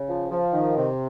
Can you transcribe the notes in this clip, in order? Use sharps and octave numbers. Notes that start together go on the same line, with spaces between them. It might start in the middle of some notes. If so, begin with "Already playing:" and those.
Already playing: C#3
F3
F3
D#3
C3